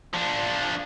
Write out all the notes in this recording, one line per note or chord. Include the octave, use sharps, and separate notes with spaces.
F3 D4